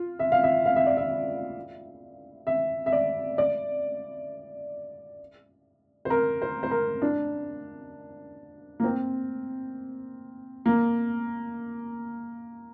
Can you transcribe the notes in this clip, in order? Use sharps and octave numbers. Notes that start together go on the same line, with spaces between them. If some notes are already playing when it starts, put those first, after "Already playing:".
Already playing: F4
E5
F5
E5
F5
E5
D5
E5
E5
E5
D5
D5
C5
A#4
C5
C5
A#4
D4
A#3
C4
A#3